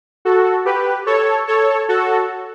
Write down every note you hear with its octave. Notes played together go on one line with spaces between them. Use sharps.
F#4 A4
G4 B4
A4 C#5
A4 C#5
F#4 A4